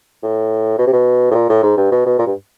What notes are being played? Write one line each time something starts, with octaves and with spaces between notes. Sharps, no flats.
A2
B2
C3
B2
A2
A#2
A2
G#2
G2
B2
B2
A#2
G2